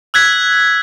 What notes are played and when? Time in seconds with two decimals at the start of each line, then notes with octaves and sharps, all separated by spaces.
0.14 E6 F#6 G#6 B6